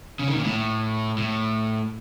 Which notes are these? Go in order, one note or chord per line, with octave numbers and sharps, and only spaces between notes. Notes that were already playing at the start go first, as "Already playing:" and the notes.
C#3
D#3
A#2
A2
A2